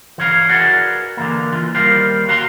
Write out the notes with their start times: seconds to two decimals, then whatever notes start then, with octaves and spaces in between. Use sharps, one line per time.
0.18 E3 C#5 F5
0.49 F#4 G#4 A#4 B4 D5 F#5
1.17 D3 E3 A#3
1.52 E3 F4
1.74 D#2 G3 A#4 C5 F5
2.28 F#4 F5 A#5 C6